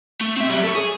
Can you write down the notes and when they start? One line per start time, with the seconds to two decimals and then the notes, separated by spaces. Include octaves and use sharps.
0.21 A3
0.37 C4 E5
0.49 F#3 G3
0.64 A4 C#5
0.76 G#4